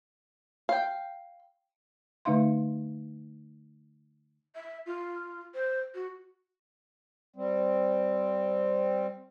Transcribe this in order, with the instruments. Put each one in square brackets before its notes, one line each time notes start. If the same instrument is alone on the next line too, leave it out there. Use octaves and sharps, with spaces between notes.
[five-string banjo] F5 G5
[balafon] D3 A3 D#4 E5 F5 C6
[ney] E5
F4
C5
F#4
[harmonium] G3 C4